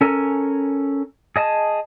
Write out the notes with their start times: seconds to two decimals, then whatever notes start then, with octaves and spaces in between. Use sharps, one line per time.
0.01 C#4 A4 A#4 G#5
1.36 G#4 D#5 G#5 A5